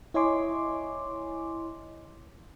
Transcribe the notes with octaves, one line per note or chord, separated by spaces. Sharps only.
E4 C#5 D#5 G#5 C6 D6